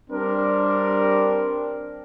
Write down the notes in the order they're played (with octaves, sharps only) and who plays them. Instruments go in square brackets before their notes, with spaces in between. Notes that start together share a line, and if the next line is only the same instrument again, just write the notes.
[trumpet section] G3 C4 D4 A#4